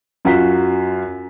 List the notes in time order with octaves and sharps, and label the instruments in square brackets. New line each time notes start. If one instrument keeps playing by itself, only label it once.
[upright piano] F#2 F4 F#4 B6